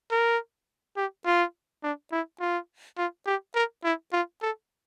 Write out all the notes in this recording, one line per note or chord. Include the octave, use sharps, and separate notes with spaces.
A#4
G4
F4
D4
E4
F4
F4
G4
A#4
E4
F4
A4